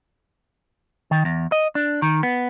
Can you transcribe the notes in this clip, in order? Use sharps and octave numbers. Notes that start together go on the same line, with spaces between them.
D#3
E2
D#5
D4
D#3
B3